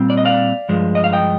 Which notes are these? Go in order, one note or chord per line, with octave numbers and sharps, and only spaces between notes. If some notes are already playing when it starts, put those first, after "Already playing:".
Already playing: A#2 G3 C4
D5
D#5
D5 F5
G2 F3 G#3
D#5
F5
D#5 G5